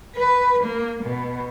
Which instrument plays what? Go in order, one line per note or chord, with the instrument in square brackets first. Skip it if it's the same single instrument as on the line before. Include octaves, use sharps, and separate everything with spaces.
[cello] B4
A#3
B2